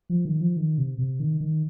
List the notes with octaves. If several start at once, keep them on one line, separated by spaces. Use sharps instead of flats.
F3
D#3
F3
D#3
C3
C3
D#3
D#3